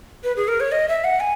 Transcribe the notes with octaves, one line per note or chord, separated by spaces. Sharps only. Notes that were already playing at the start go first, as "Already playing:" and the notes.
B4
G#4
A#4
C#5
D#5
E5
F#5
G#5